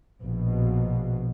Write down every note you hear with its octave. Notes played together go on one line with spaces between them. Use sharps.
A#1 B2